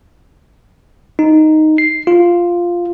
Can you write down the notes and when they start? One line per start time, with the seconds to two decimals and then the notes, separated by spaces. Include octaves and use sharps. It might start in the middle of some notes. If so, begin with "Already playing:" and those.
1.19 D#4
1.78 C7
2.07 F4